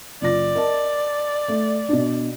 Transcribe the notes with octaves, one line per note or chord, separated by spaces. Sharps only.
F#1 F4 D5 A#6
A#4 D#5 A5
A3
B2 D4